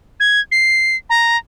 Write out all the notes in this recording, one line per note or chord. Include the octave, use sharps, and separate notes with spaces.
G#6
C7
A#5